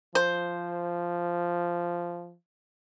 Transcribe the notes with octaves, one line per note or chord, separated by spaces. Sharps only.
F3 C5